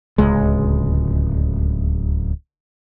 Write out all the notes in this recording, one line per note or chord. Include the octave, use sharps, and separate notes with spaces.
D1 C#2 G#3